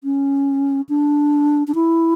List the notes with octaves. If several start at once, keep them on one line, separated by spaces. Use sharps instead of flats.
C#4
D4
D4
E4